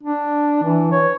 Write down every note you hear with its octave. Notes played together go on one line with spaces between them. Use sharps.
D4
E3
C#5